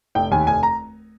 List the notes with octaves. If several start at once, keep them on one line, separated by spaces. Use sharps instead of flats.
F1 G5
D#2 D#3 G#5
F1 G#5
A#5